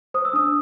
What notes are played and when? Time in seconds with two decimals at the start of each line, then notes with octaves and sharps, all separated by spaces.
0.14 C5 D#6
0.25 E6
0.33 D4 D#6